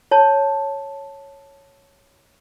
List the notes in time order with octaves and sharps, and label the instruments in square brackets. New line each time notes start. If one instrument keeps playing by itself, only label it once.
[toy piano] C#5 A5